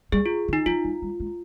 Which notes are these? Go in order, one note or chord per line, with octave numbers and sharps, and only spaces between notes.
G3 G#4
F4
D#3
D#4
F3 F4
G3
G3
G#3